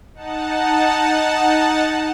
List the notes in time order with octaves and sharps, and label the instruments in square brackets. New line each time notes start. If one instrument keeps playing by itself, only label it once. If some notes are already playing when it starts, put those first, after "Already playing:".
[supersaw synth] D#4 F#5 A5